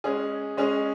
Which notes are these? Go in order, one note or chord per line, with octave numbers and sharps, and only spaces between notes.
G#3 C#4 G#4
G#3 C#4 G#4